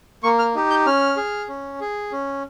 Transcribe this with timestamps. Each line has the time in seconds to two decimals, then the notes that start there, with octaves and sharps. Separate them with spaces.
0.24 A#3 C#6
0.39 F6
0.55 D#4 G4
0.70 G6
0.86 C#4 F6
1.17 G#4
1.48 C#4
1.81 G#4
2.12 C#4